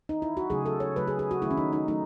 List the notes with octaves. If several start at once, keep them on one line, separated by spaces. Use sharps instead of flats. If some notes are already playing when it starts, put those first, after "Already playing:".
D#4
E4
F#4
C#3 F#3 A3 G#4
A4
C#5
C#3 F#3 A3 B4
G#4
G#4
F#4
D#3 F#3 A3 E4
C#4
D#4
D#4
F#3 A3 D#4